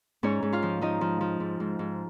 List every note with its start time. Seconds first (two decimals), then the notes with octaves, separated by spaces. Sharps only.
0.23 G#2 C#4 C#5
0.43 G#2
0.52 F4 F5
0.63 F3
0.81 F3 D#4 D#5
1.01 F3
1.21 F3
1.40 G#2
1.60 G#2
1.79 G#2